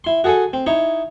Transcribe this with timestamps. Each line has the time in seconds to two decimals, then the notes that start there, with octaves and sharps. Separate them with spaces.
0.04 E4 C6
0.24 F#4 G#4 A4 F#5 G#5
0.53 C4
0.66 D#4 E4 C#5